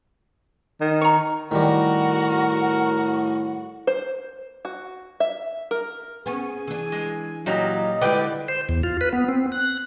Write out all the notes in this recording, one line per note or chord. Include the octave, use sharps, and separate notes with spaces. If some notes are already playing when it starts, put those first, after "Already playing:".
D#3
A#5 C#6
A2 D#3 G3 F#4 A#4
C5
F#4
E5
A#4
B3 C#4 G#4
E3 D4
G#3
A#2 F#3 G3 D#5 A#5
D3 G3 G#3 E4 B4 D5 G5
C5
E2
F4
B4
B3
C4
F#6